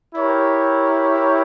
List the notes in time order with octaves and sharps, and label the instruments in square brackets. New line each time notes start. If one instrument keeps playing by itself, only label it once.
[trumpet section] E4 G4 A#4 C#5